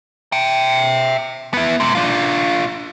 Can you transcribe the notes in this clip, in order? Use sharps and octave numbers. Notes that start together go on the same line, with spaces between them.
E5 G5
B3 E4
C3 G#3
D4 F4